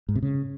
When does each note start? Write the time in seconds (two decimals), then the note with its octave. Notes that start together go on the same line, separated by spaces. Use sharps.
0.09 G#2
0.16 C3
0.23 C#3